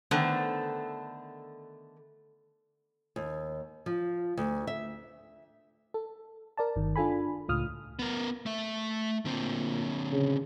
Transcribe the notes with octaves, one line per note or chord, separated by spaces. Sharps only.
D3 D#3 A3 B3 C5
D#2
F3
D2
E5
A4
A#4 D5 A5
G1 D#3
D4 F4 A4 G#5 B5
C#2 A2 F4 D#6 F6
B3 A#4
A3 E5
A#2 D3 C4
C#3